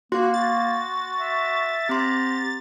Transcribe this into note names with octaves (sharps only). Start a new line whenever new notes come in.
A#3 F#4 C6
F#4 A6
E5
C4 G4 A#5 C6